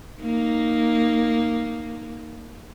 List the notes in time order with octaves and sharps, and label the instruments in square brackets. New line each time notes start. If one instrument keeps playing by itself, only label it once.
[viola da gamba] A#3 D#4